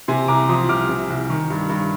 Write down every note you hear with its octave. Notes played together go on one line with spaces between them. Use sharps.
C3 G#5 C6
C2 A#5 D6
F3 C6 D#6
C2 D6 F6
C3
C2
D#3
G2
G2